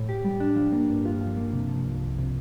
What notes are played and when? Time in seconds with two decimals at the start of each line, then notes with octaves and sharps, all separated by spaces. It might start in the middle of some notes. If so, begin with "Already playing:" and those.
Already playing: A2
0.09 G4
0.25 G3
0.40 D4
0.56 F3
0.73 A#3
0.89 G2
1.05 F4
1.21 F3
1.37 A#3
1.54 C3
1.70 F3
1.85 C2
2.02 C2
2.19 C3